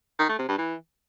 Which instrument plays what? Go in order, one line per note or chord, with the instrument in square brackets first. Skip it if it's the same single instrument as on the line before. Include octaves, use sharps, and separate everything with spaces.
[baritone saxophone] D#3
A3
C3
G2
E3